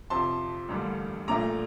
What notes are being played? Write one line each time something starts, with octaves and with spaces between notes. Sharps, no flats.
F2 C3 F3 A5 C6
A1 G2 D3 G3 A#3
A#1 A#2 A3 A#5 D6